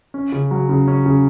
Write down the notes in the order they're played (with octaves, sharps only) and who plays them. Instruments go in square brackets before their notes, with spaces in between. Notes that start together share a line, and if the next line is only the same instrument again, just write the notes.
[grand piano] C#4
C#3
F#3
C#3
C#4
C#3